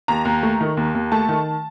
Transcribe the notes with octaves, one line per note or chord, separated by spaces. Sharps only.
D#2 A#5
D#2
A3
D#3
D#2
D#2
A3 A5
D#3